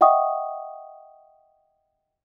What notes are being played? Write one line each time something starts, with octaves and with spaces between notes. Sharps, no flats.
D#5 E5 F#5 G5 C#6 D#6